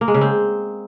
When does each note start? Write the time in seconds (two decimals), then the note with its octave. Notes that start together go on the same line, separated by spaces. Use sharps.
0.01 A#3
0.08 G#3
0.15 C#3
0.21 C4